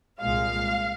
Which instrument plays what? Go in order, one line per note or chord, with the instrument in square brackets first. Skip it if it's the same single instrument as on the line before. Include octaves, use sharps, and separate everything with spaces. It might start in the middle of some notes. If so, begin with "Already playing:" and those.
[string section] C2 A#2 G#3 F5